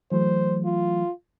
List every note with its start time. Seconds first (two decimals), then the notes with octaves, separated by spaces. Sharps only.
0.12 E3 F#3 A3 C5
0.65 F4